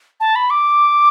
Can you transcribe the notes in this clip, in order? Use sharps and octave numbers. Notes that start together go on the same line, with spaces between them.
A5
B5
D6